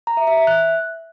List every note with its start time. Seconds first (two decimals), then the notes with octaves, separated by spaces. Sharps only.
0.07 A#5
0.17 E5
0.27 E5
0.37 E5
0.47 F#6